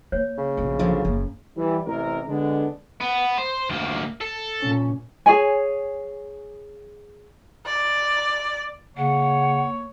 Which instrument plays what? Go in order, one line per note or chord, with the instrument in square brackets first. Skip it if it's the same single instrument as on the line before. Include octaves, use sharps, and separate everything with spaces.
[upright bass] A#3 [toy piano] C#5
[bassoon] C#3
[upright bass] A#1 B2
[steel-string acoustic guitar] D3 F3 F#3
[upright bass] F#1 A#3 [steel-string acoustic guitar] F#2
[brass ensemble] E3 G3
A1 C3 A#4
D3 G#3 B3 D4
[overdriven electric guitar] B3
C5
D2 A#3
A4
[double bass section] A#2 C#4
[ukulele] G#4 C#5 G#5
[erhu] D5
[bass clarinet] C#3 [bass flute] A#3 [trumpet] C#5 [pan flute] F#5